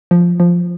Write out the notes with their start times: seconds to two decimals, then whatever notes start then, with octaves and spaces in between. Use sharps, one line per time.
0.11 F3
0.40 F3